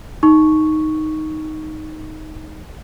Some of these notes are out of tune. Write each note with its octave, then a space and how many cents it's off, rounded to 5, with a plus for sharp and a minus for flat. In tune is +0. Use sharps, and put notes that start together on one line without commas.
D#4 +0 C#6 +0